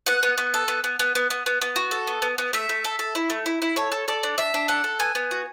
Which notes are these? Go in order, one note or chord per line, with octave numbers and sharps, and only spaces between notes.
B3 F#5
B3
B3
A4
B3
B3
B3
B3
B3
B3
B3
F#4
A4
B3
B3
B3
A3 E5
A3
A4
A4
E4
A3
E4
E4
A4 C#5
A4
A4 D5
D4
D4 E5
D4
A4 F#5
A4
B3 G#5
B3
F#4